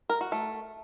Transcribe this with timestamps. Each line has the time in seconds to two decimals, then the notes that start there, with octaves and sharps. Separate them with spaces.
0.09 A#4
0.21 F#4
0.32 A3